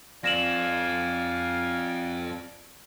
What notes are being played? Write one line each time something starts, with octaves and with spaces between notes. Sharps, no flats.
F3 C4 D5 F5 G#5 A#6 E7 F#7